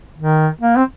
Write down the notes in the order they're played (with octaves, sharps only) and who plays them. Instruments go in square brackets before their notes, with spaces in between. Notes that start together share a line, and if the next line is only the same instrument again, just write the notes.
[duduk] D#3
A#3
C4